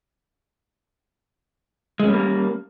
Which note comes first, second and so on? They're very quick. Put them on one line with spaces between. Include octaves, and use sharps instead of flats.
G#3 C#4 G3 A#3